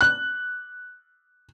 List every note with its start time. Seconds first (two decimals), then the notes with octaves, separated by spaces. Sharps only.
0.01 F#6